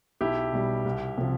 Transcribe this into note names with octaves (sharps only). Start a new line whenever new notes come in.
B1 E4 G4
B2 G3
C2
C3 F3